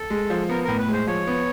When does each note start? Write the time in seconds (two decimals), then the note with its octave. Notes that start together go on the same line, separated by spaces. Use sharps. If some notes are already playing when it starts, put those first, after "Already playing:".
Already playing: A4
0.10 G#3
0.30 F3
0.49 B3 A#4
0.64 A2 A#4
0.78 B4
0.88 G#3 C5
1.07 F3 C#5
1.27 B3